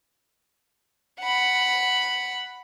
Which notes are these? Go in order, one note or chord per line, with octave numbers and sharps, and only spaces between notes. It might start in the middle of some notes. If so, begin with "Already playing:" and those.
F#5 B5